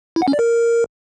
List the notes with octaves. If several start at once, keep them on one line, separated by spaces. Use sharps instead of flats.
E4
F#5
C#4
D5
A#4